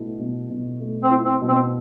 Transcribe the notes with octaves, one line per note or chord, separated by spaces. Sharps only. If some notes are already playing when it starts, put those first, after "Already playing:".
Already playing: B2 A3 E4
B2
B2
A3
C4
E4
C4
B2
C4